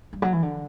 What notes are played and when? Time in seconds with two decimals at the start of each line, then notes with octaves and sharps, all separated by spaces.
0.13 G2
0.22 F#3
0.33 E3
0.43 D3